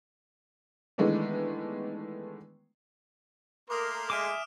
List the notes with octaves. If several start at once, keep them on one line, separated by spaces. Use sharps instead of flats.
D#3 E3 G#3 A3 B3 D4
A3 A#3 A#4 C6 D6 D#6
G#3 G#4 E5 G#5 D6 F6 D7 E7